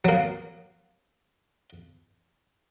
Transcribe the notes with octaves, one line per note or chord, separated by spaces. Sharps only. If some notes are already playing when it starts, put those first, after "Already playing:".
F#3 A#3